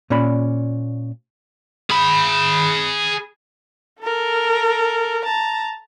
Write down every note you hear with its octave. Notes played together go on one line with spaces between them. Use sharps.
A#2 C#4 D5 B5
G#4 B5
A4 A#4
A5 A#5